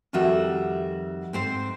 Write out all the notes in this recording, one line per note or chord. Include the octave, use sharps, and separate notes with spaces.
F2 D#3 G3 F#4 E5
G#2 C4 C5